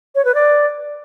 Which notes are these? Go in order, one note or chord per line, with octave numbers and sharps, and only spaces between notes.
C#5
B4
D5